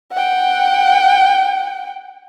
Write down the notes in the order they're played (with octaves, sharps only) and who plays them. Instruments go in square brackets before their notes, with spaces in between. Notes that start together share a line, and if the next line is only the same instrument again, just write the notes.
[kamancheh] F#5 G5